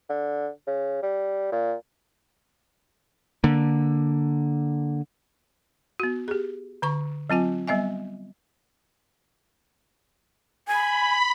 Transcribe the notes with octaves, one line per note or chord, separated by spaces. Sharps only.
D3
C#3
G3
A#2
D3 A#3
B3 F#4
G4 G#4
D3 A#5 C#6
F#3 C4 F4 G#5
G3 B3 D#5 E5 G#5
G#5 B5